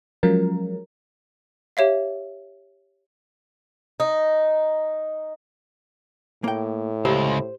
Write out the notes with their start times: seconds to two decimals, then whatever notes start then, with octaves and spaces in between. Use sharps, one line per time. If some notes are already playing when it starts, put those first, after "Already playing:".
0.23 F3 F#3 G#3 C#4 F4 A#4
1.77 G4 C#5 E5 F5
4.00 D#4
6.44 A2 A#3 G5
7.05 C#2 G4 C5